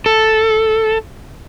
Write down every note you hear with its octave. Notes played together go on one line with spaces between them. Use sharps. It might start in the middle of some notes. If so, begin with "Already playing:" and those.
A4